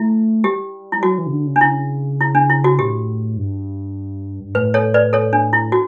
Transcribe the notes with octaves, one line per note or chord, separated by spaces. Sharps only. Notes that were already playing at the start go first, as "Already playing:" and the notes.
Already playing: A3 E4
G3 G4
G3 E4
F#3 F#4
E3
C#3
D3
C#3
D4
C#3 E4
E4
D4
E4
F#4
A2 G4
G2
G2
A2 B4
A4 C#5
B4 D5
A4 C#5
D4
E4
F#4